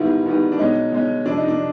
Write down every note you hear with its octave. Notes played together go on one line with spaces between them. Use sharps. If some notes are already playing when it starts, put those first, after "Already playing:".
Already playing: G#2 D#3 G3 B3 E4
G#2 D#3 G3 B3
D4
B2 G#3 C#4 D#4
B2 G#3 C#4
F2 C3 F3 D4
D#4
D4